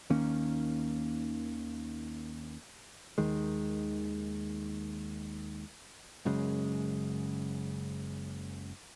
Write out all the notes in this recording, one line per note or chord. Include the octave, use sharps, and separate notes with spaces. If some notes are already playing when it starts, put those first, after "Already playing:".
D#2 D#3 A#3 C#4
D#2 D#3 G#3
F#1 F#2 C#3 G#3